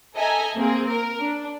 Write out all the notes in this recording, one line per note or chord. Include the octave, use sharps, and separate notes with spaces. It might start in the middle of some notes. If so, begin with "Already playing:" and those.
A4 D#5 E5 G#5 A#5
A#3 C4 G#4
A#4
D4